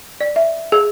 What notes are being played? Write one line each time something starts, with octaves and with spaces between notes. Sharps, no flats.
D5
E5
G#4